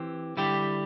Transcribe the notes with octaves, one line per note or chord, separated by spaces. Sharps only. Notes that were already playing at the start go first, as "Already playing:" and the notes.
Already playing: E3 C4 G4
D3 G3 E4 G4